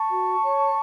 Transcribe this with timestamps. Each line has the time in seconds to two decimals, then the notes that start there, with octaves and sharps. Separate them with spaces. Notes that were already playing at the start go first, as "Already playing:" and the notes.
Already playing: A5 C#6
0.09 F#4
0.42 C#5